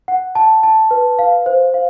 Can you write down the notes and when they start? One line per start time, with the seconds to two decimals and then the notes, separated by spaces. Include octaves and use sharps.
0.08 F#5
0.35 A5
0.63 A5
0.91 B4
1.19 F5
1.46 C5
1.74 F5